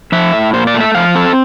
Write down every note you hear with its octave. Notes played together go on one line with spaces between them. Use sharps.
F3 E5
A2
A#2 C5
D5
A3
E5
F3 F5
C4 A4